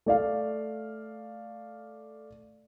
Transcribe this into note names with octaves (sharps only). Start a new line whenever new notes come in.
A3 D5 F5